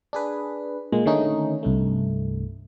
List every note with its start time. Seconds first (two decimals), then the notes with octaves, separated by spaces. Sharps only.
0.13 D4 G#4 B4
0.92 A#2 G#3 A#3
1.05 D3 D#3 A3 C#4 D#4
1.63 C2 G2 A3